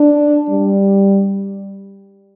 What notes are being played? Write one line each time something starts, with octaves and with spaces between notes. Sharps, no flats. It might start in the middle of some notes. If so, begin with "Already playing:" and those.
Already playing: D4
G3